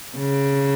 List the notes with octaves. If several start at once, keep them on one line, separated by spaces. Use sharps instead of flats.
C#3